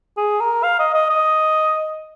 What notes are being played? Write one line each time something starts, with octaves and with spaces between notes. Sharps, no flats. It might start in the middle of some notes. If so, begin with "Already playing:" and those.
G#4
A#4
F5
D#5
D#5
D#5